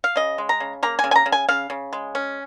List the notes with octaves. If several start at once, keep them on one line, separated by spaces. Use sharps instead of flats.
F5
C#3 D#5
G#3
A#5
C#3
A#3 A#5
G#5
C#3
G#5
A#5
C#3
G#5
C#3 F5
C#3
G#3
C#4